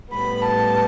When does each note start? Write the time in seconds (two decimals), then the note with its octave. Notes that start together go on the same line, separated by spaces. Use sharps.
0.13 A2 G3 B3 B5
0.45 A5